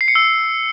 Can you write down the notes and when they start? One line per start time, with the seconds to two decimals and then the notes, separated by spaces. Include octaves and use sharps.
0.01 C7
0.08 C#7
0.15 E6